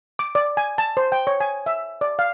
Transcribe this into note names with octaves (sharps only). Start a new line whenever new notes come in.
D6
D5
G#5
A5
C5
G5
C#5
G#5
E5
D5
F5